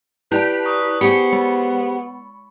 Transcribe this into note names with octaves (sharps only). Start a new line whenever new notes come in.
E4 G4 B4 D5 A5
A#5 C#6 D#6
B3 G4 G#4 C5 B5 C#6 C#7
G#3